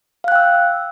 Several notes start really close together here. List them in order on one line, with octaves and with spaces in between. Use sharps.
F5 F#6 G5 E6